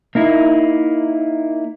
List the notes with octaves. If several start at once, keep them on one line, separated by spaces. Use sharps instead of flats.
A#3 D#4 E4